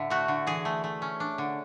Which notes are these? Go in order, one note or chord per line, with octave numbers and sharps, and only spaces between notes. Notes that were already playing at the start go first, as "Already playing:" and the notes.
Already playing: A2 D3 E4
A3 F#4
D3
E3 G#4
A3
A3
C#4
D4
D3